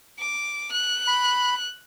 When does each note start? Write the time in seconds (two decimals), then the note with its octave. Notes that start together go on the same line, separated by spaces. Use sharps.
0.19 D6
0.71 F#6
1.08 B5